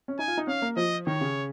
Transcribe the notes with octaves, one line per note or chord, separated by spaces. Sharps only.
C#4
D#4 G#5
F4
D#4
C#4 F5
A#3
F3 D#5
D#3 C#5
C#3